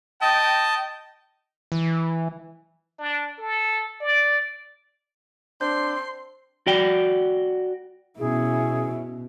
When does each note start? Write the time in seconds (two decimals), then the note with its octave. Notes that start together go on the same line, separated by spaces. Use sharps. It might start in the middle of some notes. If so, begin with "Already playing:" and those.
0.21 D#5 G5 A5
1.72 E3
2.99 D4
3.38 A4
4.01 D5
5.61 C4 D4 C6 G6
6.67 F#4 D5 G5
8.19 B2 C#4 E4 G#4